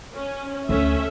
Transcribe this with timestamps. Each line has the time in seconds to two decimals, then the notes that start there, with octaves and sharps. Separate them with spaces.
0.15 C#4
0.69 D2 A3 C#4 E5